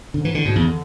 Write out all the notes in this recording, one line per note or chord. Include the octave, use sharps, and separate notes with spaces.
G#2 D3
E3
A2 D3
G#2 B2
E2 C#3
D3